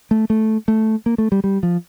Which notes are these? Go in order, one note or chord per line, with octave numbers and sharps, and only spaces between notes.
A3
A3
A3
A#3
A3
G3
G3
F3